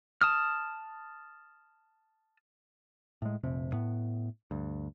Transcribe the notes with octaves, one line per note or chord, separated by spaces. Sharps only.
A5 D#6 F6
A2 G#3
F1 A#1 C3
A2 B3
D2 G2